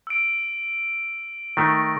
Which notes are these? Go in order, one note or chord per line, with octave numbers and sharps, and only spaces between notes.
E6 D7
D#3 A3 A#6